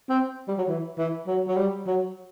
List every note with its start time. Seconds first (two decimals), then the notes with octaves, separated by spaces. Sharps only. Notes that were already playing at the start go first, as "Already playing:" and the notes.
0.09 C4
0.48 G3
0.58 F#3
0.68 E3
0.99 E3
1.27 F#3
1.48 F#3
1.57 G3
1.87 F#3